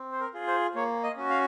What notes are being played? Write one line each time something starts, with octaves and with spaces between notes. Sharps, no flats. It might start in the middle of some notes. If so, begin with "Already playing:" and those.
Already playing: C4
C5
A#4
F4 G#4
C5
A#3 C#5
D#5
C#4 F#4
F5